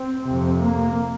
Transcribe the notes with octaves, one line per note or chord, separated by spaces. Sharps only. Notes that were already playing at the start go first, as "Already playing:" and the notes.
Already playing: C4
F2 C3
A#3